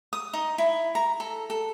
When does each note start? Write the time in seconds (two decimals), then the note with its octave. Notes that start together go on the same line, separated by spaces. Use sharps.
0.13 D#6
0.33 D#4
0.58 E4
0.95 A#5
1.20 A4
1.50 A4